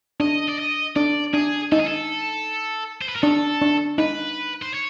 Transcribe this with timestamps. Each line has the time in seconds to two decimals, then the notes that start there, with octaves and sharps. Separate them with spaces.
0.20 D4 D#5
0.48 D5
0.58 D#5
0.96 D4 D5
1.34 D4 G#4
1.72 D#4 A4
1.80 G#4
1.87 A4
3.01 C5
3.09 B4
3.16 A#4
3.23 D4 A4
3.61 D4
3.98 D#4 B4
4.62 C5
4.74 C#5